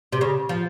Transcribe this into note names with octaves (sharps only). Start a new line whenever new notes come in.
C3
C#3
F3